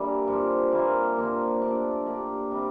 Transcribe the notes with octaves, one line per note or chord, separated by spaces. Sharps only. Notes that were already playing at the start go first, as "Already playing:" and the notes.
Already playing: E3 G3 A#3 D4 G4 A#4
G2 F3 C4 G4
E3 A#3 F4
G2 F3 A#3
A3 D4 A4 D5
A#3 D4 G4 D5
C3 G3 C4